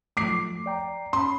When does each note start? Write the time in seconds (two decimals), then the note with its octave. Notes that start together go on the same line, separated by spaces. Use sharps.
0.17 F3 F#3 A3 D6 C7
0.66 D5 G5 A#5
1.13 C#4 B5 C6